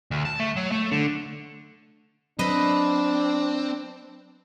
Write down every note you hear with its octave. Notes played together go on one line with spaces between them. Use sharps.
D2
A5
A3
F#3
A3
D3
F#3 C4 D4 B4 D#5